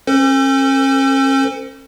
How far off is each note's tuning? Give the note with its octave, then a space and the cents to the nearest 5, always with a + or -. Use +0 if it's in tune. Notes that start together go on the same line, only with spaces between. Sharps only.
C#4 -40 A4 +35 C5 -30